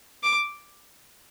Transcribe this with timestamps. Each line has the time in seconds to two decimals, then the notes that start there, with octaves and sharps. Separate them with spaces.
0.23 D6